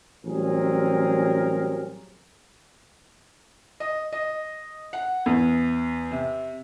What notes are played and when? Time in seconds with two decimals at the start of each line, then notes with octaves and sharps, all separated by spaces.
0.24 A1 F#3 G3 C4 G#4 A#4
3.80 D#5
4.12 D#5
4.93 F#5
5.26 E2
6.11 C3